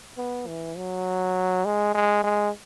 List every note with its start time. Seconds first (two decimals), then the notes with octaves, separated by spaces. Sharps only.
0.18 B3
0.47 E3
0.77 F#3
1.65 G#3
1.95 G#3
2.24 G#3